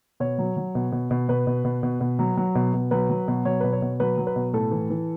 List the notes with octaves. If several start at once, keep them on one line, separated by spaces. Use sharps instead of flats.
B2 C#5
F#3
F#3
B2
B2
B2
B2 B4
B2
B2
B2
B2
F#3
F#3
B2
B2
F#3 B4
F#3
B2
F#3 C#5
B2 B4
C#5
B2
F#3 B4
F#3
B4
B2
A2 A4
E3
E3